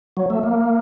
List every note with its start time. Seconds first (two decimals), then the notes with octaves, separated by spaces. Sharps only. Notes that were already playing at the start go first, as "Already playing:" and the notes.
0.17 F#3
0.30 A3
0.43 A#3